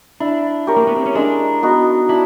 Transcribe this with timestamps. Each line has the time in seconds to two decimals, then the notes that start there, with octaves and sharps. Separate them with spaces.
0.20 D4 E4
0.67 G4 A#4 C#5
0.76 A#3
0.87 B3
0.97 C4
1.06 C#4
1.15 G#3 D4
1.63 B3 D#4 F#4
2.09 D4 E4